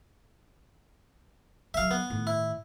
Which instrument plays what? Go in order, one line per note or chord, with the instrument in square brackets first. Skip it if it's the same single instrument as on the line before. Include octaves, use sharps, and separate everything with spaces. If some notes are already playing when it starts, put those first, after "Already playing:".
[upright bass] D3 F#3 [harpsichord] E5 F5
[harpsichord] B3
[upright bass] A2 D#3
[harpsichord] E4